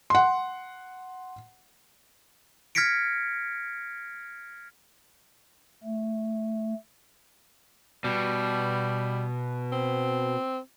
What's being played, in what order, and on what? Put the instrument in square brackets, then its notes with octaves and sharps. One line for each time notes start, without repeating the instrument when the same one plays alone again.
[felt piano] F#5 C6
[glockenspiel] F6 G#6 A#6 B6 C#7 D7
[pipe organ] A3
[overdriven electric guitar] B2 [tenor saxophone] G3
[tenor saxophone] C4